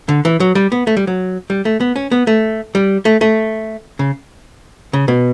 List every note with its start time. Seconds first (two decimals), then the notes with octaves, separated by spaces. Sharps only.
0.09 D3
0.25 E3
0.40 F#3
0.55 G3
0.72 B3
0.87 A3
0.97 G3
1.07 F#3
1.50 G3
1.65 A3
1.80 B3
1.96 C#4
2.11 B3
2.27 A3
2.75 G3
3.05 A3
3.21 A3
3.99 C#3
4.93 C#3
5.08 B2